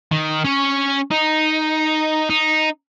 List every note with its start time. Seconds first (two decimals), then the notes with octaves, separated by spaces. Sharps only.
0.12 D#3
0.45 C#4 C#5
1.11 D#4
2.30 D#4